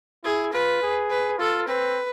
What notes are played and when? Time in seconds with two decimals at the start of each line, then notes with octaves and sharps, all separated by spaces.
0.24 E4 G#4
0.52 F4 B4
0.82 G#4
1.10 B4
1.38 F4 A4
1.67 C4 B4